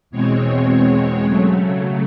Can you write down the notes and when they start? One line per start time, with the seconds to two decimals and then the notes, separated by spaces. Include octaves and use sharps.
0.11 E2 B2 G#3 C4 C#5
1.24 C#3 F#3 A3